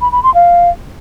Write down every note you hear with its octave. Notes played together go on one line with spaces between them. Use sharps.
B5
B5
C6
F5